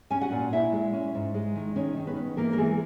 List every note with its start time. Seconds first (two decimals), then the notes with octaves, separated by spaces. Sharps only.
0.10 C#4 G#5
0.21 F#4 F#5
0.32 A#2
0.52 A#2 E4 E5
0.72 G#3
0.93 C#4
1.15 G#2
1.34 G#3
1.56 D#3
1.76 D#3 C#4 C#5
1.97 D#3
2.07 B3 B4
2.16 C#4
2.37 E3 A#3 A#4
2.53 A#4
2.58 E3 G#3 G#4